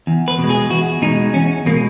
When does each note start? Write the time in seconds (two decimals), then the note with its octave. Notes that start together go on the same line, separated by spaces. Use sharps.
0.07 E2
0.28 B4
0.39 B2 G#3
0.50 G#4
0.70 E2 F#4
1.02 B2 G#3 D#4
1.34 E2 C#4
1.66 B2 G#3 A#3